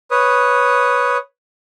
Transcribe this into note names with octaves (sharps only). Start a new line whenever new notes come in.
B4 C#5 D#6